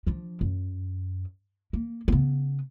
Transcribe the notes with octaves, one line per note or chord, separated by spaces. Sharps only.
F3 D4
F#2
A#3
C#3 B3